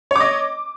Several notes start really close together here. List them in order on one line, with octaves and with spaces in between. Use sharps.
C#5 D6 D#5